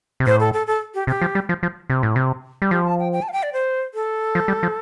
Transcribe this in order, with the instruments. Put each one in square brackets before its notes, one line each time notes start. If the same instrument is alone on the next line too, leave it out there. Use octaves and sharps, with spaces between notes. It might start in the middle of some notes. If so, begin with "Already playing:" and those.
[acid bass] C3
[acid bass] A2 [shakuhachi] C5
[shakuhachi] A4
A4
A4
G4
[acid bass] C3 [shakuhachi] G4
[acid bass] F3
G3
F3
F3
C3
A2
C3
G3
[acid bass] F3 [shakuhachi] G4
[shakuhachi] A5
G5
G5
A5
F5
G5
D5
C5
A4
[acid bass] F3
G3
F3